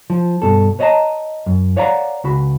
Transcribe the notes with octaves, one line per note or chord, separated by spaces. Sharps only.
F3
G2 B2 A4
B4 C#5 D#5 F5 A5 A#5
F#2
B4 C#5 D5 F5 F#5 A#5
C#2 F#4 B5